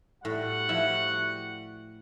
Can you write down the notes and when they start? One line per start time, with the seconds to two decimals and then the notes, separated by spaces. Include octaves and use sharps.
0.25 A2 G3 F#4 F#5
0.69 F3 E4